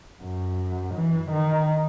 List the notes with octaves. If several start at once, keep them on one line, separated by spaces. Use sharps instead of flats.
F#2
E3
D#3